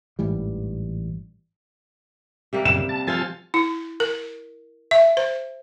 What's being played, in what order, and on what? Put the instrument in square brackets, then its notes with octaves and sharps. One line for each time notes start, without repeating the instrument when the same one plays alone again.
[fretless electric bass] A1 G#2 E3 G3
[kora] C3 G3 A#3
[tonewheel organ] F#2 A#2 C#3 [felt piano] E7
[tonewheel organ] A5
[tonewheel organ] F3 G#5 A6 [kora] A4 C5 F5
[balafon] E4
A#4
E5
C5